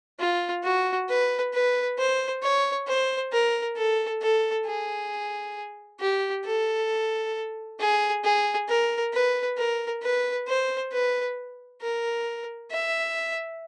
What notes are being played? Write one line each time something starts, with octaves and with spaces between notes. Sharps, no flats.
F4
F#4
B4
B4
C5
C#5
C5
A#4
A4
A4
G#4
G4
A4
G#4
G#4
A#4
B4
A#4
B4
C5
B4
A#4
E5